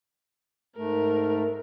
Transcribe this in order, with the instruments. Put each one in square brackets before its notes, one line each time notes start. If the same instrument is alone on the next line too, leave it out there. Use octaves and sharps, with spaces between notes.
[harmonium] G#2 A3 [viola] A#4